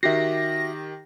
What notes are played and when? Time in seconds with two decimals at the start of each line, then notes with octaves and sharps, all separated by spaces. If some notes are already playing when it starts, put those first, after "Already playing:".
0.03 D#3 F#4 G4 E5 A#6 C7